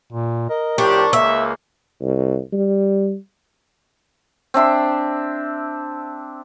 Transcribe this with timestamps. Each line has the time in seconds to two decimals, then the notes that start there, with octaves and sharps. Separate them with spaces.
0.12 A#2
0.49 A#4 D#5
0.78 A2 F3 D4 G4 C#6
1.13 C#2 A#3 E5
2.01 C2
2.53 G3
4.54 C4 D4 E5 C6